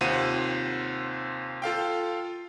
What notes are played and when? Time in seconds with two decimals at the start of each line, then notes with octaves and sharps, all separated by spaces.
0.01 D#2 C3 F4 C5 F#5 D#7
1.62 F4 A4 F5 G5